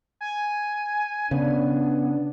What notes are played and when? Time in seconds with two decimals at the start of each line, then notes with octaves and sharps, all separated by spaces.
0.21 G#5
1.31 C#3 B3 D4